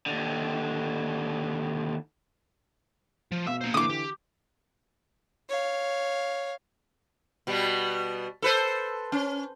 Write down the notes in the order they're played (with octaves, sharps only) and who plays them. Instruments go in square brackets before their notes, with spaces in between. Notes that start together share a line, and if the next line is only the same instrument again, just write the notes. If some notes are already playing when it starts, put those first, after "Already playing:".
[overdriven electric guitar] D#2 D3
[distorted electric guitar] F3
[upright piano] B2 F5 E6 [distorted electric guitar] E5
[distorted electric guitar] A#3 C5
[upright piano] D3 E3 [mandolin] D6 D#6
[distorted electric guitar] G4
[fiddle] C#5 F5
[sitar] B2 G3 B3
A4 B4 C5
C#4